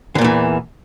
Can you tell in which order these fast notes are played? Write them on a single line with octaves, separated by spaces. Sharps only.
D3 A#2 E2 E3